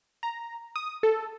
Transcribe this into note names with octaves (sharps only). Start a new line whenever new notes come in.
A#5
D#6
A4